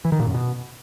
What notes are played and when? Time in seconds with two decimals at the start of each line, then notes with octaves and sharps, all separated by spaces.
0.05 E3
0.12 D#3
0.20 A#2
0.27 F#2
0.34 B2